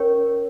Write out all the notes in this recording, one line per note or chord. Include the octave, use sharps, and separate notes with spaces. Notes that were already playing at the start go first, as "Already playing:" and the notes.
Already playing: C#4 G4 A#4 C#5